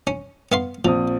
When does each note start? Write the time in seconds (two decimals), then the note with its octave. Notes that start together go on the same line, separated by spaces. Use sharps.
0.07 C#4
0.52 B3 F5 C6
0.85 A#1 F3 C4 D#6